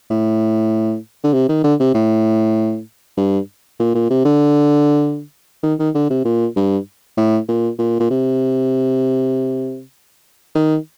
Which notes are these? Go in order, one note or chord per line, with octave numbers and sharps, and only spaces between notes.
A2
D3
C3
D#3
D3
C3
A2
G2
A#2
A#2
C3
D3
D#3
D#3
D3
C3
A#2
G2
A2
A#2
A#2
A#2
C3
D#3